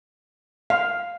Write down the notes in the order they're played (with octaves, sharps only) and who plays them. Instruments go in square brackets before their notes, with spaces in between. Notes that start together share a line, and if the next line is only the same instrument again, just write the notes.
[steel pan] F5